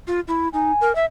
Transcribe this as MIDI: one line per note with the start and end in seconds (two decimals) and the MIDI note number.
0.07 0.20 65
0.28 0.48 64
0.53 0.72 63
0.53 0.87 80
0.81 0.95 70
0.95 1.05 76